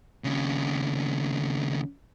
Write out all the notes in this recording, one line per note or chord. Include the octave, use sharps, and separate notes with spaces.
D#2 C#3